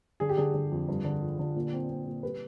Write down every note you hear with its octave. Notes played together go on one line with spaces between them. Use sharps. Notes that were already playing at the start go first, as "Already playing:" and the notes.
D3 G#4
G4
D3 G#4
D3
F2
G2
D3
F3
D3
A#2
C4
C4
A#2
G3 B4